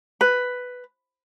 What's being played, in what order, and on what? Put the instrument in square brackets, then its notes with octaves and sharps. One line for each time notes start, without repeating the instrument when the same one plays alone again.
[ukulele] B4